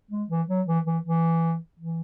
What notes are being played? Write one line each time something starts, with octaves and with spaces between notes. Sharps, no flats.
G#3
E3
F#3
E3
E3
E3
E3